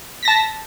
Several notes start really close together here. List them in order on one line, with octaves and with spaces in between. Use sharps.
B6 A#6 A5